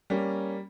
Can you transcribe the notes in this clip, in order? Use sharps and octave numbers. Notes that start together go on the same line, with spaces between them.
G3 A#3 C#4